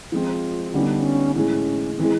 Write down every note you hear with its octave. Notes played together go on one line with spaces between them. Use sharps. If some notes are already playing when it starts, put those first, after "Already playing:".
F3 G#3 C4 F4
D3 G3 B3 C#4 D#4
D4
C#4
A2 E3 G#3 C#4
E3 G#3 C4